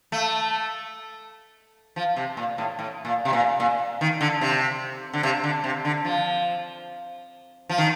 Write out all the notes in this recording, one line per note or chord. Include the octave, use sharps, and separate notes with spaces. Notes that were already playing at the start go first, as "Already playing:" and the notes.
A3
F3
C3
A#2
A2
A2
A#2
C3
A#2
A#2
D#3
D3
C3
D3
C3
D3
C3
D3
F3
F3
D#3